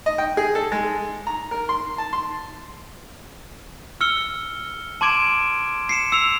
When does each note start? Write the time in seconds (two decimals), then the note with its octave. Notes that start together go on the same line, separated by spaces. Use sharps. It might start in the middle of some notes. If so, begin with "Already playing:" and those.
0.06 D#5
0.18 G5
0.37 G#4
0.55 A4
0.72 G#3
1.27 A#5
1.51 A#4
1.69 C6
1.98 A5
2.13 C6
4.01 E6 F6 C#7 G7
5.01 A5 C6 D6 G#6 D7 E7
5.89 C7 C#7 E7
6.12 E6 C#7 F7